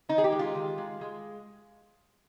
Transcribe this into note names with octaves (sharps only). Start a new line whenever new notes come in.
D#3 D#4
G#4
G4
G#3
F4
D#3
G#3
G#3